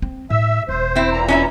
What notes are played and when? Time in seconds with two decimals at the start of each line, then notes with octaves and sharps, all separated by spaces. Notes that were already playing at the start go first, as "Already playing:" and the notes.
0.02 C4
0.30 A2 E5 E6
0.68 E1 C5
0.95 C4 E4
1.12 A#2 E3 A#5
1.28 C#4 D#4 E4